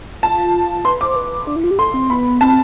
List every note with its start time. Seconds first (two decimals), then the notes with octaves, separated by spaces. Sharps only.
0.23 F4 A5
0.85 B4 C6
1.00 C5 D6
1.16 B4
1.47 D4
1.56 E4
1.64 F4
1.71 G4
1.79 A4 C6
1.94 C4
2.10 B3 B5
2.41 C4 A5